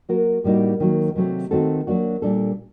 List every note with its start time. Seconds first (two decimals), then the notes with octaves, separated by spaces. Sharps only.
0.09 F#3 A#3 F#4 A#4
0.44 A2 G3 A#3 D#4 F#4
0.80 D#3 F#3 A#3
1.16 C3 F#3 A3 C4 G4
1.51 D#3 A3 C4 F#4 A4
1.87 F#3 A#3 D4 F#4
2.22 A#2 G3 D4 A4